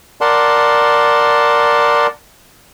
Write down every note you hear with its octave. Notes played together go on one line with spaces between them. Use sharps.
A#4 D5 F#5 A5 C6